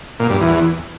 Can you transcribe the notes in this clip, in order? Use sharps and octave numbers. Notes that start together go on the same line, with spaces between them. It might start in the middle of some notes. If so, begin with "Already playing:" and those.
A#2
G2
E2